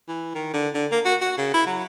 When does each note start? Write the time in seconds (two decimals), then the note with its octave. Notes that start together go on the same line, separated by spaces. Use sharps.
0.08 E3
0.35 D#3
0.53 D3
0.74 D3
0.92 A#3
1.05 F#4
1.21 F#4
1.38 C#3
1.54 E4
1.67 F#3